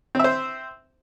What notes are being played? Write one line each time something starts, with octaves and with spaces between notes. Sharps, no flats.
C4 C5 E5